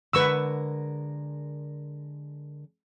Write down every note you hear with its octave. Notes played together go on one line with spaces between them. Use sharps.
D3 G#3 A#4 B4 C#6 E6